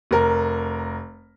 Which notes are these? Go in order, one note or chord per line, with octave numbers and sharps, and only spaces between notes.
F1 A#4